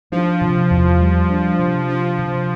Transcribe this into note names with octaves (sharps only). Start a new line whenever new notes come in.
F3 D4
C3
E2
G3
D4
C3
F3 D4
C3